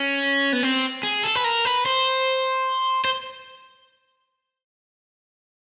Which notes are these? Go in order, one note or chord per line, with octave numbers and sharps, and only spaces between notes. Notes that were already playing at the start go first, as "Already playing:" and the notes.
Already playing: C#4
B3
C4
G#4
A4
B4
A#4
B4
C5
C5